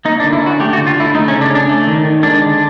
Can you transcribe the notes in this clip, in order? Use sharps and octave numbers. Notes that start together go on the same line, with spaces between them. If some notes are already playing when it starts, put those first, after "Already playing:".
A#3 D#4
D4
D3
E4
C#4 F#4
A3 G4
F#4
D3
F4
D3 E4
A3 D#4
C#4
C#3
D4
C#4
D4
A3
D#3
D#3
G#3 D4
D3